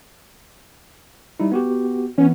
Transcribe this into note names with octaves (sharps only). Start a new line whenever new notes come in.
G3 D#4 E4
B3 F#4 G4
E3 B3 C#4